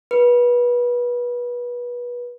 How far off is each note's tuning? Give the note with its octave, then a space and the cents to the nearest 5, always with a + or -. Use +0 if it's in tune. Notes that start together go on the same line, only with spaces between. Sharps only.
B4 -25